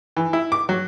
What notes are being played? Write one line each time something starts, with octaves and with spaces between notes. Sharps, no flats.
E3
E4
D6
F#3